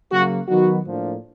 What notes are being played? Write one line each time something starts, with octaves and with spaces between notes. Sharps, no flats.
C#3 F#3 A#3 F#4
D#3 F#3 B3 D#4 F#4
A2 F3 A#3 D4